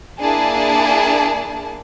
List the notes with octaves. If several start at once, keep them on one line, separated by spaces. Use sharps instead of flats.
A#3 D4 E4 G#4 A5